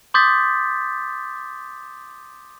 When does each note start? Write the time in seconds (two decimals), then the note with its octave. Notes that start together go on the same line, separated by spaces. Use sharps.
0.14 C6 D6 D#6 G6 A6 B6